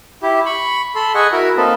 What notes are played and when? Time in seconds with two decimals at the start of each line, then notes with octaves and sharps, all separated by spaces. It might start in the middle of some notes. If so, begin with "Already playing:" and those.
0.23 E4 G4
0.46 B5 C#6
0.95 A4 B5 C6
1.15 G#4 D#5 F#5 G#5 C#6
1.32 E4 F#4 A#4 E5
1.57 A#3 C4 D#4 A4 B4